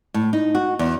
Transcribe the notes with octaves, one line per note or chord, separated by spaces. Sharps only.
A2
D#4
F#4
E2